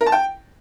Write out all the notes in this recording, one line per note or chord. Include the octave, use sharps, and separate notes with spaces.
A#4
A5
G5